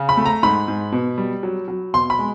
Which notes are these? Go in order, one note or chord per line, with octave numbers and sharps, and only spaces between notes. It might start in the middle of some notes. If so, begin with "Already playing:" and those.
Already playing: C#3
B5
A3
A#5
G#2 B5
G#2
B2
G3
F#3
F#3
B2 C6
B5
G#3